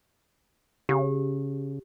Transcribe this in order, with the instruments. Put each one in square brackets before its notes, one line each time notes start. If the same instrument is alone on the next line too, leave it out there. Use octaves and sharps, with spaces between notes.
[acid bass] C#3 [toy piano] G4